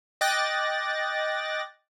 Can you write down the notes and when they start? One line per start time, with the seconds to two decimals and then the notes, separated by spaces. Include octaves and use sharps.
0.21 D#5 G5 D6 F#6 A6 A#6